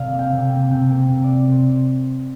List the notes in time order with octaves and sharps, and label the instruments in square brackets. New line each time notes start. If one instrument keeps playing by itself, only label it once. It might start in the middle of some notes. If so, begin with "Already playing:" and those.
Already playing: [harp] C3 D5 F5
A#3
G5
C3
G5
A#3
C3 G5
A#3
C3
D5
A#3
C3 C5